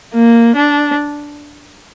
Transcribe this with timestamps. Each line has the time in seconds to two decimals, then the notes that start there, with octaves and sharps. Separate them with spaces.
0.14 A#3
0.56 D4